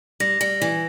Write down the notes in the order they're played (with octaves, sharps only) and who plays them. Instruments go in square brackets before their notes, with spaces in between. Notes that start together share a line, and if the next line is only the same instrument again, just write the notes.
[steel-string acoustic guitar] G3 [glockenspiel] A#6
[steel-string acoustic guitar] G3
E3